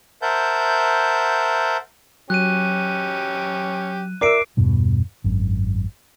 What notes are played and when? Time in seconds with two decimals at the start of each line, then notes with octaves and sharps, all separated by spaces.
0.22 A#4 C5 E5 F#5 A5 G6
2.30 F#3 C#4 G4 F#6 D#7
4.21 A#4 D5 E5 D6 E6 C7 D7
4.57 E2 G2 B2 G3
5.24 G#1 F#2